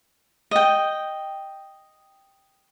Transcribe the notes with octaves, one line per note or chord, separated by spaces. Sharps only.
D#5 G5